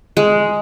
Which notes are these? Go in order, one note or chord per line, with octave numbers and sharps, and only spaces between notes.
G#3